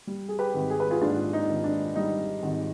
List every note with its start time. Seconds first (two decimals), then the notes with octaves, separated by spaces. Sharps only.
0.07 G3
0.29 G#4
0.39 G4 B4
0.54 G#1
0.70 G#4
0.80 B4
0.91 F4 G#4
1.01 G#2 D4 F4
1.33 D#4
1.49 G#1
1.64 D4
1.96 G3 D#4
2.43 G#1